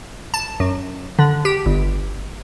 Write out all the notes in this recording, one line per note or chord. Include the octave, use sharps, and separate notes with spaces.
A5
F#2
D3
G4
G1